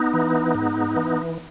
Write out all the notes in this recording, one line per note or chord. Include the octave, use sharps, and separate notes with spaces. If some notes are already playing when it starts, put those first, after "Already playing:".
Already playing: B3 D#4
E3
G#2
E3